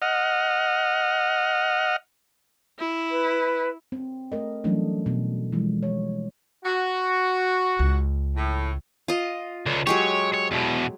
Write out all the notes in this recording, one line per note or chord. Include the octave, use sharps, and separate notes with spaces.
D#5 F#5 F6
E4
B4
C4
A3 A#4 D#5
E3 F#3 G3 A3 C#4 D4
B2
E3 F3 G3 G#3
C#5
F#4
C#2
A2
F4 D#5
C#2 D3
F#3 G#3 G4 C#5
C#5
E2 B2